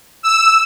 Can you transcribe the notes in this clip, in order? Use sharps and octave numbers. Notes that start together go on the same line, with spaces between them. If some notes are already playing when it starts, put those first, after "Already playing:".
E6